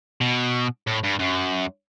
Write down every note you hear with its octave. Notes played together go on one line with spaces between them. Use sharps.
B2
A2
G2
F#2